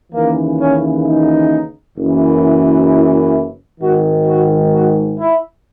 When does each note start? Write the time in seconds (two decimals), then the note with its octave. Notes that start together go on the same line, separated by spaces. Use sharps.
0.13 D#2 C#3 E3 A#3
0.60 C#4
1.05 D#4
1.97 F#1 F#2 E3
2.89 E4
3.80 G#1 G#2 D#3 F#4
4.27 F#4
4.72 F#4
5.19 E4